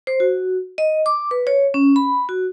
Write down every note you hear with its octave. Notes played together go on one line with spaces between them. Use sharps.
C5
F#4
D#5
D6
B4
C#5
C#4
B5
F#4